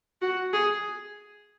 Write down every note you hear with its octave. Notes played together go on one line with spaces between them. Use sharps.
F#4
G#4